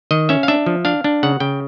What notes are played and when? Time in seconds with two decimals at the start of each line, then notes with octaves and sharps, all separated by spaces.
0.11 D#3 D#5
0.29 C#4 E5
0.43 F5
0.48 D4 E5
0.66 F3
0.85 D4 F5
1.04 D4
1.23 C#3 F#5
1.40 C#3 G5